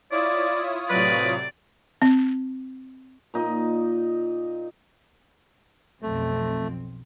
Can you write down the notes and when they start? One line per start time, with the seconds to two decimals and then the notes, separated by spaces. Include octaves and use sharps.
0.12 E4 F4 C#5 D5 D#6
0.90 A2 C3 F#3 B4 D5
2.02 C4
3.34 A#2 D#4 D#5
6.02 B1 F2 A3 C4